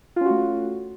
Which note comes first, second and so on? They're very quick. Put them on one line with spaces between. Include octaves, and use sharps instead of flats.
F4 C#4 F#4 A3